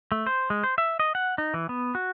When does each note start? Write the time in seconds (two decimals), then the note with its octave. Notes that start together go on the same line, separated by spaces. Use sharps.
0.12 A3
0.26 C5
0.50 G#3
0.64 C5
0.78 E5
1.00 D#5
1.15 F#5
1.38 D#4
1.54 E3
1.69 B3
1.95 F#4